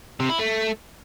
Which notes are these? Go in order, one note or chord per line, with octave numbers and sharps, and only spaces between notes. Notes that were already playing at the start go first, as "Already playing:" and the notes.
C3
E4
A3